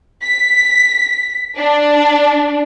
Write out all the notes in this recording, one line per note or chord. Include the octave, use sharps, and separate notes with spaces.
B6
D4